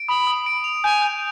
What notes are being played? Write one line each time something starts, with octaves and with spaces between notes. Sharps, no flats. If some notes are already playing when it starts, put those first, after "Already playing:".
Already playing: D7
B5 D#6
D#6
D7
F7
G#5 G6
G6